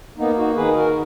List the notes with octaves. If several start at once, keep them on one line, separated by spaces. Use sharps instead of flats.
A#3 B3 D#4
D#4 F#4
D#3 G#4 B4
F#4 A#4